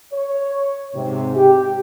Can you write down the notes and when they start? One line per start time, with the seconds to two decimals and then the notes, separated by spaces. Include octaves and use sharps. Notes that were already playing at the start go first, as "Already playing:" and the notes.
0.13 C#5
0.95 G#2 C3
1.36 G4